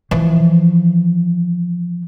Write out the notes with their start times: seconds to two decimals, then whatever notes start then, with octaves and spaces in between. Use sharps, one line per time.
0.11 E3 F3